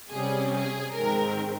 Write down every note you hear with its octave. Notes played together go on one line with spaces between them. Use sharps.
C3 G3 C#4 G#4
G#4
G#2 D#3 G#3 C4 A#4